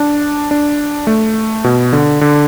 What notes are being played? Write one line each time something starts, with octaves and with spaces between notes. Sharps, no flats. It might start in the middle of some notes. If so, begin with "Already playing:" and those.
Already playing: D4
D4
A3
B2
D3
D3